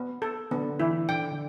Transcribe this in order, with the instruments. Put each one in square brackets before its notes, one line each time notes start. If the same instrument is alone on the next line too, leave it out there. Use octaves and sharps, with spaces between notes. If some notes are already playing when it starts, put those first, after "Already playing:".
Already playing: [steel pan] B3
A4
[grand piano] D3 [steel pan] B3
[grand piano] E3 [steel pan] E4
[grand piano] D3 [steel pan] G5
[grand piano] D3